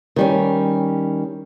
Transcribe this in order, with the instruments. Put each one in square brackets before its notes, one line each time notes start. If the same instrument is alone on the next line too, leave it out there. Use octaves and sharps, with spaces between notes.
[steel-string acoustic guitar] D#3 G3 C#4